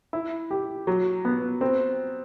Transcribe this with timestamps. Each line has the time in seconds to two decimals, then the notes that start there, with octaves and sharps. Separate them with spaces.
0.13 E4
0.51 G4
0.87 F#3
1.25 B3
1.61 C4